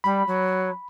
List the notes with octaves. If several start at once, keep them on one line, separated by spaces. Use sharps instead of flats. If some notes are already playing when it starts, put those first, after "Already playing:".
G3 B5
F#3